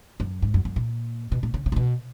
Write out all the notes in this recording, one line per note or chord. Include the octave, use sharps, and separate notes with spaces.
F#2
G#2
F#2
F#2
A#2
B2
A#2
C#3
C#3
A#2
B2